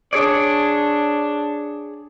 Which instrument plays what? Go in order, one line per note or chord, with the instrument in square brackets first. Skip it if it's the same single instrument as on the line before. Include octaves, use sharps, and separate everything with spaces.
[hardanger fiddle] D4 [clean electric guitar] G#4 C#5 D5